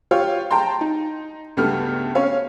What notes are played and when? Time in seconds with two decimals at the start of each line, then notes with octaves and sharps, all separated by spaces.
0.11 F4 G4 C#5 F5
0.51 G5 A5 A#5 C6
0.81 D#4
1.57 C#2 G2 A3 B3 G4 F6
2.15 C#4 C#5 F5